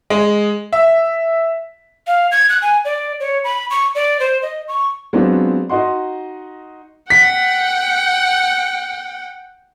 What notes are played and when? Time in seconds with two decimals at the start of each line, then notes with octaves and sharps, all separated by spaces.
0.10 G#3
0.73 E5
2.07 F5
2.32 G#6
2.49 F#6
2.62 G#5
2.85 D5
3.20 C#5
3.44 B5
3.70 C#6
3.95 D5
4.20 C5
4.42 D#5
4.68 C#6
5.13 F#3 G#3 B3 C4 D4 F4
5.69 D#4 F#4 D#5 F#5 C6
7.10 F#5 G5 B6